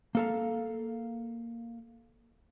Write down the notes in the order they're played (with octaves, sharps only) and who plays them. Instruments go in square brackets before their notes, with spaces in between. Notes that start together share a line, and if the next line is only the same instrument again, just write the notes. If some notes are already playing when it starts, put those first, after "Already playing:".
[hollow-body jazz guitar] A#3 A4 F5